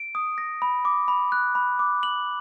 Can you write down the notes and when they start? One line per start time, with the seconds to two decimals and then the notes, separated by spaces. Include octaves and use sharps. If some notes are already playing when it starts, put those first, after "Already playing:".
Already playing: D7
0.15 D#6
0.38 A#6
0.62 B5
0.85 D6
1.08 B5
1.32 F#6
1.55 B5
1.79 D6
2.03 F#7